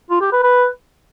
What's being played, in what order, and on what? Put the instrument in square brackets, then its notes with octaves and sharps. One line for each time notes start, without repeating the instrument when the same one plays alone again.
[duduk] F4
G4
B4
B4